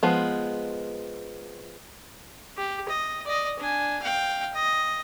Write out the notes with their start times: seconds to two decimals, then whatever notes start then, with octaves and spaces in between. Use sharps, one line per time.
0.03 F3 G#3 B3
2.57 G4
2.89 D#5
3.25 D5 D#5
3.59 D4 G#5
4.02 F5 G5
4.54 D#5